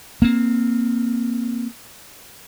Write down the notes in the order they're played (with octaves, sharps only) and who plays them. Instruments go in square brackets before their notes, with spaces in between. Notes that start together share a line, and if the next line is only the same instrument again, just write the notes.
[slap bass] A#3 C4